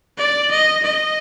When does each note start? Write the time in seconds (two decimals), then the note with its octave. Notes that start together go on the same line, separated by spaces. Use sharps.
0.18 D5
0.51 D#5
0.83 D#5